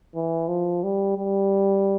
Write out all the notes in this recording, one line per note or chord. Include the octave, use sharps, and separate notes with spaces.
E3
F3
G3
G3